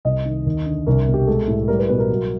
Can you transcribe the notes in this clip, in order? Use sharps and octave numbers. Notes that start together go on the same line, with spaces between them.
C2 D#5
D#3
D#2
D3
C2 A#4
B2
G4
G#3 A4
A2
G3 A#4
B4
B2 B4
A#4
F#3